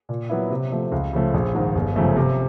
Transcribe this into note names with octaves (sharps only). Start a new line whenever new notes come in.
A#2
F#3 B3 E4
C3
F3 A3
C#2
C#3 F3 A3
A#1
G#2 D#3
G1
F#2 C#3 F3 A3
C3